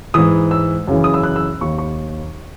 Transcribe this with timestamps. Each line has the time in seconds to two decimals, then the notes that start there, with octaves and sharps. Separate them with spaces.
0.14 G#2 E3 D#6
0.51 E6
0.88 F#2 C#3 E3
1.04 D#6
1.14 E6
1.23 F#6
1.36 E6
1.61 D#2 D#3 C#6
1.78 C#6